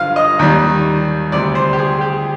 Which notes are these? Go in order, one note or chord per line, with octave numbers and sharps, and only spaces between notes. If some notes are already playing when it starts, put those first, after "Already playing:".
Already playing: G2 D3 F3 F5
D#5
D#2 D#3 G3
D2 C3 G3 D5
C5
G4
G#4
G4